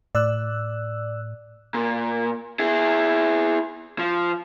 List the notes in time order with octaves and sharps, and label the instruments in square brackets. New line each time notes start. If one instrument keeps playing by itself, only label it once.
[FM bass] A2 [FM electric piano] D5 E6 F#6
[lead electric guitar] A#2
E4 G#4
F3